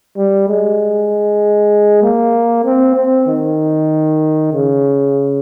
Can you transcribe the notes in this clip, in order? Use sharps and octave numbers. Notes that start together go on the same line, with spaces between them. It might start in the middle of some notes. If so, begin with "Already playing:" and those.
G3
G#3
A#3
C4
C4
D#3
C#3